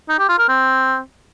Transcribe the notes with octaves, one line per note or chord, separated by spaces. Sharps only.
D#4
G4
F4
A#4
C4